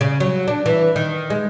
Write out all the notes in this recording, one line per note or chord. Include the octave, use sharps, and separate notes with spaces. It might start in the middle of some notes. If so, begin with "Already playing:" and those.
C#3
F#3
D4
E3
D#3
G#3